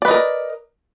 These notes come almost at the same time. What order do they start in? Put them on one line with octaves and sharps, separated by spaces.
D5 B4 D#5 A#4